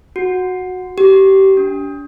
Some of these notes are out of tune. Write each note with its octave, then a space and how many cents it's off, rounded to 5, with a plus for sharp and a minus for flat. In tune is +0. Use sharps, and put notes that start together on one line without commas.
F#4 -10
G4 -25
D4 -40